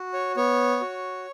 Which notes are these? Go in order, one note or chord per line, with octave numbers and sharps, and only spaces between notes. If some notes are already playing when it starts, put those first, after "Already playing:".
Already playing: F#4
C#5
B3 C#5
F#4